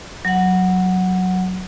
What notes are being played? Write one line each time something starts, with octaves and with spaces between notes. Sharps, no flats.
F#3 F#5